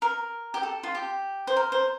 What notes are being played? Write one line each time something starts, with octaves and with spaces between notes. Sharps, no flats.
A#4
G4
A4
F4
G4
C5
A#4
C5